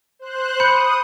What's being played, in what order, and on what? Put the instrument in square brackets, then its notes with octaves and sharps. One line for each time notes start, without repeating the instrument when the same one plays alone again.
[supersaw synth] C5 F#6
[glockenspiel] B5 G6 C#7 [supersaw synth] D#6